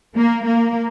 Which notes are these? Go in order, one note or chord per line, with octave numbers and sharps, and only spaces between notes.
A#3
A#3